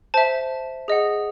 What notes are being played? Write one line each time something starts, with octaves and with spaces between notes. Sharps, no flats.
C5 E5 A5
G#4 D#5 F#5